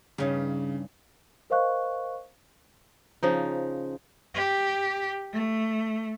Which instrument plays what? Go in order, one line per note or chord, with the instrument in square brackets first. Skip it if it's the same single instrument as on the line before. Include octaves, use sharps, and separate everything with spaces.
[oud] G2 C#4 D#4 [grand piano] C#3
[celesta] A#4 C5 D#5 F5 C#6 F#6
[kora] C#3 F3 D#4
[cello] G4
A3